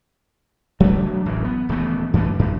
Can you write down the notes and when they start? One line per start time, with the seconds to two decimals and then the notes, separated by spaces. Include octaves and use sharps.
0.80 F#3 A3 C4 D4
1.26 D1 A1 F#2 E3
1.45 B3
1.69 D#1 E3 A3 B3
2.13 F#2 E3 A3 D4
2.39 F#2